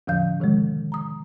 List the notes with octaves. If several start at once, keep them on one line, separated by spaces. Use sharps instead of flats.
E2 A2 D3 F3 F5 G6
C3 D#3 F3 G#3
A#5 D#6